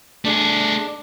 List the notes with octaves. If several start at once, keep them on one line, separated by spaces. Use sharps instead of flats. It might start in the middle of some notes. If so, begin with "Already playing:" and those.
A3 D4 G#4